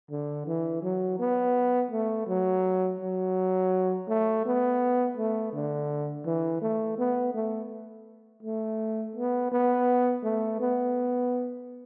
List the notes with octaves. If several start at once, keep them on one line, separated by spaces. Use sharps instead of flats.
D3
E3
F#3
B3
A3
F#3
F#3
A3
B3
A3
D3
E3
A3
B3
A3
A3
B3
B3
A3
B3